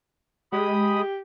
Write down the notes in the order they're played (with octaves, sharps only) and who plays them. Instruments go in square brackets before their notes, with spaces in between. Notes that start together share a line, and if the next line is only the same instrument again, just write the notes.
[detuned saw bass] G#3 [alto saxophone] G4 [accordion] B5 D#6